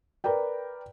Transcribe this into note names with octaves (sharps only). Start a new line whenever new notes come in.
A#4 B4 D5 G5